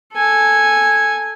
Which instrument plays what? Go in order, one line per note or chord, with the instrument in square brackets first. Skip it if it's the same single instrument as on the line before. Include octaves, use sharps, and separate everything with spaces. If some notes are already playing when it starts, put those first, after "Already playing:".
[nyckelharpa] A4 G#5